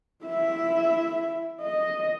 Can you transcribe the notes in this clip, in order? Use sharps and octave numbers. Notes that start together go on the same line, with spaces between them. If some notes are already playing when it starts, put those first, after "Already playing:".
E4 E5
D#5